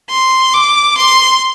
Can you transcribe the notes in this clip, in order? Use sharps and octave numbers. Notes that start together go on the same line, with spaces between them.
C6
D6
C6